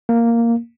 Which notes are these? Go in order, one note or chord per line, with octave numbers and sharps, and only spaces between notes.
A#3